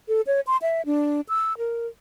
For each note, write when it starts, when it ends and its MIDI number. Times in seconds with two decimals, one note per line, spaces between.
0.08 0.21 69
0.27 0.40 73
0.47 0.57 84
0.62 0.82 76
0.86 1.21 62
1.29 1.56 88
1.58 1.87 70